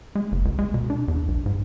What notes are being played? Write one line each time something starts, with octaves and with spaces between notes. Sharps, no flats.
G#3
F#1
C#2
G#3
B2
D4
E2
B1
G#2